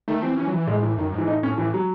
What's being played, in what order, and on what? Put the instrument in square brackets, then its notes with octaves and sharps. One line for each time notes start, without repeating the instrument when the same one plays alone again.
[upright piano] D#3 [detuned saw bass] A3
[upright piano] E3 [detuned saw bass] C4
[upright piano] E3 [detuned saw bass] C#4
[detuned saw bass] F#3
E3
[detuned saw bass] A2 [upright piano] G#3
[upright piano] E3
[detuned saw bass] F#2 [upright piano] D#3
[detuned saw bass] G#2
[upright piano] E3
[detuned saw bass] A2 [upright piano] D#4
[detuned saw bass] A2 [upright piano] C#4
[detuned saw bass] A2 [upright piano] E3
[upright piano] F#3